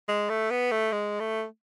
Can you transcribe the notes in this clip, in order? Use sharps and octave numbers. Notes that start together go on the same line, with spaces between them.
G#3
A3
B3
A3
G#3
A3